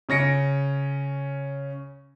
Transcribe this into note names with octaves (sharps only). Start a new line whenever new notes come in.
C#3 C#4 A#6 C#7 D7